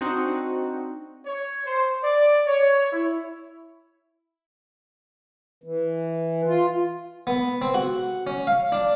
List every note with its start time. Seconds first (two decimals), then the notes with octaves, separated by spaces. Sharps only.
0.01 C4 D4 D#4 F#4
1.25 C#5
1.67 C5
2.03 D5
2.47 C#5
2.92 E4
5.64 E3
6.46 F4
7.27 B3
7.62 C4
7.74 F#4
8.27 C#4
8.47 F5
8.72 D4